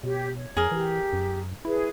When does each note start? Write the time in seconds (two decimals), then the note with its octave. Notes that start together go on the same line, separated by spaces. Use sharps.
0.04 B2 G4 C#5
0.36 C#5
0.57 F2 G#4 A#4
0.71 E3 G4
1.13 F#2
1.65 E4 G#4 B4